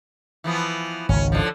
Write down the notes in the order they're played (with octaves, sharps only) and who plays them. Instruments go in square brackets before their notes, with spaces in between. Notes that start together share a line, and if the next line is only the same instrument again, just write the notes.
[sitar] E3 F3 B3
[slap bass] G#1 C#2 [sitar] C#4
[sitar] D3 F3